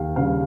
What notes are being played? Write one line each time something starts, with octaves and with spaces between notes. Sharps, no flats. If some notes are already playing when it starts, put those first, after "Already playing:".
Already playing: D#2 G4 F5
C#3 G3 F5